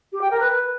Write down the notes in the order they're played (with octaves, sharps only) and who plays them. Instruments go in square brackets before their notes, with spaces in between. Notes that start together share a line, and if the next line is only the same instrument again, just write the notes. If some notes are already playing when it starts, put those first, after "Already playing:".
[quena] G4
G5
A#4
B4